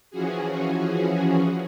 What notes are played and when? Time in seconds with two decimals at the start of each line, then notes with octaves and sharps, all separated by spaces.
0.11 E3 F3 C#4 F#4 G#4